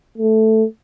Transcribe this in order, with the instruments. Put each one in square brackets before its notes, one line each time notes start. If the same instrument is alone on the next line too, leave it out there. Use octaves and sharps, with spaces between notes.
[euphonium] A3